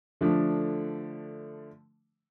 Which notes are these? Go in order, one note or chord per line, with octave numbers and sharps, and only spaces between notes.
D3 F3 A3 D4